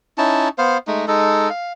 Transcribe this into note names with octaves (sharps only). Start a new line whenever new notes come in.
C#4 D#4 E4 A5
B3 C5 F5
G#3 A3 D#4
G#3 D#4 A4
F5